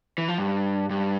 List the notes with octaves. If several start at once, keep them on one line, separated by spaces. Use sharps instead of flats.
E3
F3
G2
G2